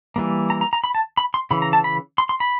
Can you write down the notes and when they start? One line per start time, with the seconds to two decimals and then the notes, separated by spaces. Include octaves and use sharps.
0.16 E3 G3 A#3
0.50 A#5
0.61 A#5
0.73 A#5
0.84 B5
0.95 A5
1.17 B5
1.34 C6
1.51 C#3 E3 B5
1.62 A#5
1.73 A5
1.84 B5
2.18 C6
2.29 C6
2.40 B5